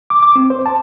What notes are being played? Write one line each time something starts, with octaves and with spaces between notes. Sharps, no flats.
D6
D6
C4
C5
A5